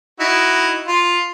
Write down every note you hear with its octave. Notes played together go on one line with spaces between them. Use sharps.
D#4 E4 F#4
F4